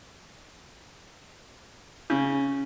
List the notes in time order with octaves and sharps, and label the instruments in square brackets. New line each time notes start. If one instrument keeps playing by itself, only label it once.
[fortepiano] C#3